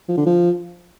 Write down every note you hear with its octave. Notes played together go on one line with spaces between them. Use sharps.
F3
D3
F3